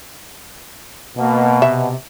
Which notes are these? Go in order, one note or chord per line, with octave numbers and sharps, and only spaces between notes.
B2 A#3
C3 E5